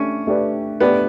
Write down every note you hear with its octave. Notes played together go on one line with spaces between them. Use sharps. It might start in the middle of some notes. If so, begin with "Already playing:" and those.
Already playing: A3 C#4 D4 G4
A3 D4 G4 B4 D5
A3 B3 D4 G4 B4 D5